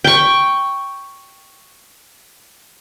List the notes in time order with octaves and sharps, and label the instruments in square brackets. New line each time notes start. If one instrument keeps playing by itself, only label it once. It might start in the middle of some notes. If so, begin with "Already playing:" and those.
[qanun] G5 C#6